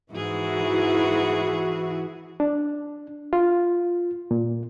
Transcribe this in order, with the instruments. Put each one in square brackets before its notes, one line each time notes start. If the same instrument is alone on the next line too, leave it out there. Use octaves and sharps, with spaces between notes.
[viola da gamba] G#2 G#4 [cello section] E3 E4 F#4
[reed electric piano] D4
F4
A#2